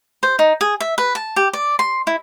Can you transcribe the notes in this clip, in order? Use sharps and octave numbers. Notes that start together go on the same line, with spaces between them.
C5
D#4
G#4
E5
B4
A5
G4
D5
C6
E4